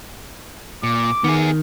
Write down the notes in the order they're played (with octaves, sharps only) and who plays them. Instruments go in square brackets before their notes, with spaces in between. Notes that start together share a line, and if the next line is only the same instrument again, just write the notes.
[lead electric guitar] A#2 [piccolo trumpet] D6
[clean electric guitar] D#3 [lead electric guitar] B3 G#4